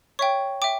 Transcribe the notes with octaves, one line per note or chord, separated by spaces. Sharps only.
C#5 E5 G5 C#6
E5 G5 D6